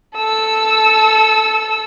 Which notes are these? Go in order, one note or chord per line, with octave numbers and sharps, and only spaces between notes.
A4 E6